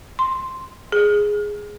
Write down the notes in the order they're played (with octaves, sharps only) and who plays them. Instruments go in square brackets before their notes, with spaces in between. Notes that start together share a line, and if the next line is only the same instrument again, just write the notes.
[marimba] C6
G#4